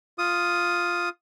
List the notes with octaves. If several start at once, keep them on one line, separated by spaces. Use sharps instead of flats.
F4 D#6